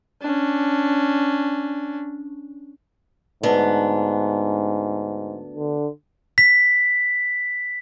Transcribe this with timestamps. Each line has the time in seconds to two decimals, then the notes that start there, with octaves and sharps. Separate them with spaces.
0.22 C#4 D4
3.43 D2 G#2 B3 D4
5.57 D3
6.38 B6